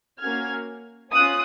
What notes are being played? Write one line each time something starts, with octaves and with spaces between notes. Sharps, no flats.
A#3 C#4 F#4 F6 G#6
C#4 F4 D#6 F#6